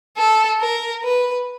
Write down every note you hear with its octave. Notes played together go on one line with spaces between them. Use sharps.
A4
A#4
B4